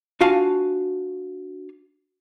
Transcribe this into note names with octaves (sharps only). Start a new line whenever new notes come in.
D4 F4 F#4 F5 G#5 A5